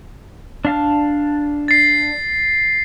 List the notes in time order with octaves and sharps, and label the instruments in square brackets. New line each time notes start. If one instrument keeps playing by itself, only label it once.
[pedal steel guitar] D4 F5 A5
[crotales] A6 C7